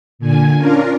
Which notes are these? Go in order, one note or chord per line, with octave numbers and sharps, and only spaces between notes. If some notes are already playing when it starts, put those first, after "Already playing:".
A#2 D3 G#5
C#4 D4 F4 A#4